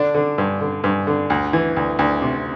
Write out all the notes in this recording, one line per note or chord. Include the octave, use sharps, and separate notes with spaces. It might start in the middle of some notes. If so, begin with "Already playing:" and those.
Already playing: D3 D4
D3
G2
D3
G2
D3
D2
E3
D2
D2
C3